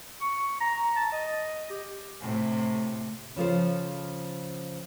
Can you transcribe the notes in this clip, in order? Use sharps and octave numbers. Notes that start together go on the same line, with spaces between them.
C#6
A#5
A5
D#5
G4
A2 C3
C#3 F3 A4 C5